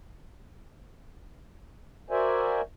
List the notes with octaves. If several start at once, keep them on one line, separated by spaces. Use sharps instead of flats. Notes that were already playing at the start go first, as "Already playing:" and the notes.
F#4 A#4 C5 D5 E5 G#5